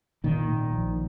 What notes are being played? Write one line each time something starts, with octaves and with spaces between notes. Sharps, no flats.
A#2 D#3
A#2
A#1